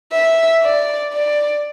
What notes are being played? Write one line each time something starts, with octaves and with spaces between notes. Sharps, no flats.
E5
D5
D5